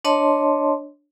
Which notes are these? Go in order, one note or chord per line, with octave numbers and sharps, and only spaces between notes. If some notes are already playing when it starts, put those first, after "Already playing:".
D4 C#5 D#5 A5 C6